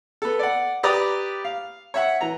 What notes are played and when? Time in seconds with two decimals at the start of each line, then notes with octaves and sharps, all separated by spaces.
0.22 B3 A4
0.39 D5 F#5
0.83 G4 B4 D5 A#5 D#6
1.45 F5
1.94 C#5 E5 F#5
2.21 E3 A#5